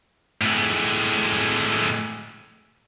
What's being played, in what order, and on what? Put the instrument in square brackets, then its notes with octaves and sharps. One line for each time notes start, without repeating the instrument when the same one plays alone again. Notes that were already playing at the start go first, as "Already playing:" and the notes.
[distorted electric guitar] A2 G#3